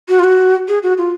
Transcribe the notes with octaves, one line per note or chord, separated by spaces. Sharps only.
F#4
F4
F#4
G#4
F#4
F4